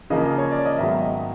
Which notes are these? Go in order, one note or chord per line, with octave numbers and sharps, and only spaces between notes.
C#3 F3 A#3 D#5
C#5
D5
D#5
G#2 D#3 F#3 B3 E5
D#5